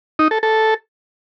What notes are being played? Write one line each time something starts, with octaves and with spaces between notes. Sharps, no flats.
D#4
A4
A4